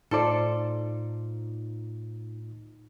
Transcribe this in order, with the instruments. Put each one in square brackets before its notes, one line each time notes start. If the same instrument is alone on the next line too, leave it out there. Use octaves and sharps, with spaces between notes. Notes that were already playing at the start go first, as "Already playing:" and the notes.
[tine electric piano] A2 F4 [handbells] D#4 [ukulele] A4 C5 D5